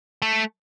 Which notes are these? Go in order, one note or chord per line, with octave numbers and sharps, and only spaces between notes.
A3